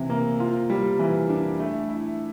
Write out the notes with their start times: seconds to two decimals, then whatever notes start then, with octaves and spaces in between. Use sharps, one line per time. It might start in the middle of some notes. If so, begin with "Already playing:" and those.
Already playing: C3 E3
0.10 A#3
0.40 F4
0.70 G3
0.99 E3
1.29 D4
1.59 A3
1.89 E4